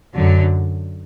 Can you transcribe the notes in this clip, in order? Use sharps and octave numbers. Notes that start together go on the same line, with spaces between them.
F#2 D3 F#3